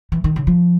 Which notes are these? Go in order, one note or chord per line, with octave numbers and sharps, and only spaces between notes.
E3
D#3
C#3
F3